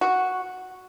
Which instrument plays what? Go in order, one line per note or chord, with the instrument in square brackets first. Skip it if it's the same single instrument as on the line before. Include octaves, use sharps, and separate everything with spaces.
[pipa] F#4